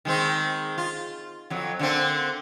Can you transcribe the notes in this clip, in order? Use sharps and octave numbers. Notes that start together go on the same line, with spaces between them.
D#3 G#3 C4
F4
F2 F#3
D3 A#3 C4